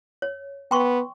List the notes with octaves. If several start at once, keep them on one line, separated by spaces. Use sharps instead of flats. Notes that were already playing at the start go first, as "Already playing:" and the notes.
C#5
B3 G5 C6 C#6